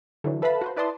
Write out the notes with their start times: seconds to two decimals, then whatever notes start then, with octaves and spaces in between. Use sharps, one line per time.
0.24 D3 E3 F#3
0.42 A4 B4 E5 F5 A5 B5
0.61 F#4 B4 C5
0.76 E4 B4 D5 A5 C6 D#6